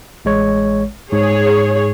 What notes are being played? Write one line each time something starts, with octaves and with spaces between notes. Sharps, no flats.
A1 G#3 C#5
G#2 G#4 C#5